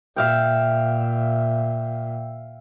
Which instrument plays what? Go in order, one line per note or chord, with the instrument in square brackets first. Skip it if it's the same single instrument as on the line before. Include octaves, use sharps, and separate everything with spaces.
[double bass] A#2 [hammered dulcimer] E5 F5 G5